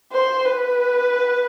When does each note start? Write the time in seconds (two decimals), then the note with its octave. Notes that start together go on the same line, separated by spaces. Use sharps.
0.12 C5
0.46 B4